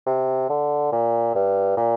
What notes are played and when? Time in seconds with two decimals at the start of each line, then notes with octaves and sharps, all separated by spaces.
0.06 C3
0.49 D3
0.92 A#2
1.35 G2
1.77 A#2